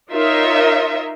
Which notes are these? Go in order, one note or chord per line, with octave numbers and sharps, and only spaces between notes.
D#4 F4 A#4 C#5 D#5 E5